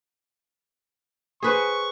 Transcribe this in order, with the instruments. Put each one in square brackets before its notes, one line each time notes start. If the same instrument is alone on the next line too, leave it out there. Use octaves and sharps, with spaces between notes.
[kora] G#4 B4 C5 [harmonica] C#6